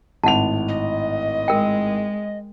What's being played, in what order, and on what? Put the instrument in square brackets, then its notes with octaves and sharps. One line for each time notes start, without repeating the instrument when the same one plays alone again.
[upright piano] G#1 A2 F7 [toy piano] F#5 A5
[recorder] D#5
[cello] G#3 [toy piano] A#4 G5